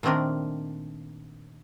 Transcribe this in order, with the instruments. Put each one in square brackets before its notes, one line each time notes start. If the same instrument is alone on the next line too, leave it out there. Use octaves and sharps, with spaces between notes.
[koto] A#2 D#3 A3 C4 D4 A#4